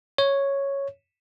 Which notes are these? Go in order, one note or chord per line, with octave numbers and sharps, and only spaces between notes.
C#5